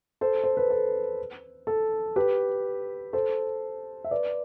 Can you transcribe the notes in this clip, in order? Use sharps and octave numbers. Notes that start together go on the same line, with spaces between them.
A4 C5
C5
B4
A4
A4
G4 B4
A4 C5
E5
B4 D5